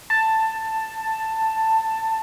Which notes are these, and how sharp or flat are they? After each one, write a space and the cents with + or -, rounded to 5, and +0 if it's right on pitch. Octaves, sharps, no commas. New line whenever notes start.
A5 +15